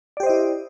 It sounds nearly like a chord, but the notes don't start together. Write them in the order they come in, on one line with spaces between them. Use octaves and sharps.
D5 G4 C5 D#5 E4